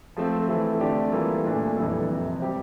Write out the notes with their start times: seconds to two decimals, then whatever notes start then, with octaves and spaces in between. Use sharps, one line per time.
0.16 F3 A3 C4
0.48 E3 A3 C4
0.81 D3 A3 C4 G4 D5
1.12 E3 G3 A#3 F4 A4
1.44 A#2 A3 D4 A4
1.77 F2 E3 G3 D4 A4
2.09 F2 C3 E3
2.40 G3 C4 G4 C5